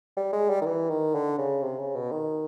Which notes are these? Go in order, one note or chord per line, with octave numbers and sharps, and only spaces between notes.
G3
G#3
G3
D#3
E3
D#3
D3
C#3
C3
C#3
B2
D#3